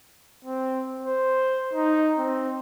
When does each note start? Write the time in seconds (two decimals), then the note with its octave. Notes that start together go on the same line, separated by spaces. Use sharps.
0.45 C4
1.03 C5
1.73 D#4
2.18 C4